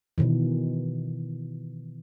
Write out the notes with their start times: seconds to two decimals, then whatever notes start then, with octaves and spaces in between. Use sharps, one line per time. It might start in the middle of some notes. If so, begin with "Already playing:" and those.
0.18 B2 D#3 E3